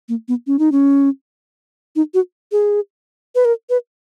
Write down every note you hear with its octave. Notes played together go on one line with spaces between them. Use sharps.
A#3
B3
C#4
D#4
C#4
D#4
F#4
G#4
B4
A#4
B4